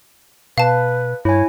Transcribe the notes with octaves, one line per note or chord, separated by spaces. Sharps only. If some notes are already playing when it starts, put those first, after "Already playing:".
B2 B4 F5 A5
G2 E4 C#5 G#5